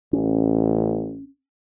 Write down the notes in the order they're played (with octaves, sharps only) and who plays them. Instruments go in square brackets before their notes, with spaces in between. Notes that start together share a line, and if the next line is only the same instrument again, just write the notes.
[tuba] A1 [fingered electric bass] C#4